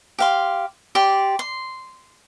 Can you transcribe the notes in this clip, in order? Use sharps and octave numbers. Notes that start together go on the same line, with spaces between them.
G4 F5 C6
G4 D5 C6
C6